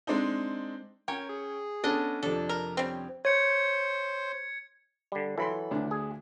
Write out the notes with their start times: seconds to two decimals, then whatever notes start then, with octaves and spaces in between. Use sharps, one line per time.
0.07 G#3 C4 D4 D#4
1.08 C#4 A#4 C#5 G5
1.29 G#4
1.84 B3 C#4 D4 A4 D#5
2.23 F2 C3 D4 A4
2.49 A#4
2.77 G3 C4 C#4
3.25 C5 C#5 G#6 C#7
5.12 D3 G3
5.38 E3 F#3 A4 B5 C6
5.71 D2 D4
5.91 G#4